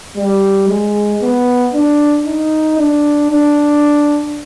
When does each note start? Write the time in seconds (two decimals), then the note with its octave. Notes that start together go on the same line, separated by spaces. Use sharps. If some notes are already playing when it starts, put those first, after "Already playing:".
0.16 G3
0.68 G#3
1.21 B3
1.74 D4
2.26 D#4
2.78 D4
3.31 D4